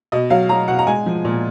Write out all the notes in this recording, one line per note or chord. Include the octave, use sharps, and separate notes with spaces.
B2 D#5
F#3 F5
F#3 A#5
B2 F#5
A#5
G#3 G#5
F3
A#2